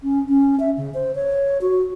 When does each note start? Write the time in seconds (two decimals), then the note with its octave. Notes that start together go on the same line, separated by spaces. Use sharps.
0.03 C#4
0.29 C#4
0.60 E5
0.77 C#3
0.94 C5
1.15 C#5
1.61 F#4